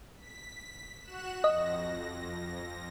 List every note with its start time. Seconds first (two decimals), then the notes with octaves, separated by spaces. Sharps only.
0.16 B6
1.02 F#4 F#6 E7
1.44 F2 D#5 A#6